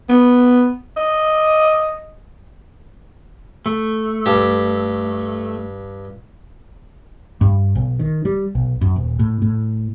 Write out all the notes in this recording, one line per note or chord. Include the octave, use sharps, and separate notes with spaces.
B3
D#5
A3
G2 G4 A5
G2
B1
D#3
G3
B1
F#2
D#1
A2
A2